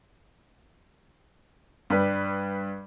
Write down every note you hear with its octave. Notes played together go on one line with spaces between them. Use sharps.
G2 G3 B4